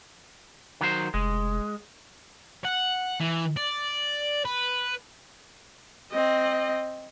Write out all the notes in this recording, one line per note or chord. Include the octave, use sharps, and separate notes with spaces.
D#3 F#3 C5
F1 G#3
F#5
E3
D5
B4
C4 D#5